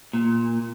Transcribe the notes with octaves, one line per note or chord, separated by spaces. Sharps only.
A#2